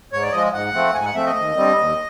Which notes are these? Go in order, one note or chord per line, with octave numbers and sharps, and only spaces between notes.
G#2 C#5
D5
F3 G#3 D#5
G#2 F#5
F3 A3 C4
G#2 G#5
F#5
F3 A3 C4 E5
D#5
D#2
D3 G3 C4
D#2